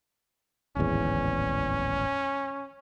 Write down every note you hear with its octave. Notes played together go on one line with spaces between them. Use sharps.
D1 G#1 E2 C#4